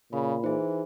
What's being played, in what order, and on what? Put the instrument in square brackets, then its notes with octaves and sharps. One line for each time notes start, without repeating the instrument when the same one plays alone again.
[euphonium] A#2 [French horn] C#3 [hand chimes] B5
[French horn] E3 [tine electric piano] D#4 [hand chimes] G#4 C5